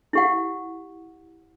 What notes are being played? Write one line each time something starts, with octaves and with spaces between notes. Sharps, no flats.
E4 G4 F#5